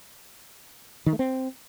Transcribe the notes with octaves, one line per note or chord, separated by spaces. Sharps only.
D#3
A3
C4